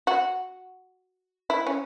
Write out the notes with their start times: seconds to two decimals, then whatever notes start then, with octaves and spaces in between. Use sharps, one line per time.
0.07 F#4
1.50 E4
1.67 C#4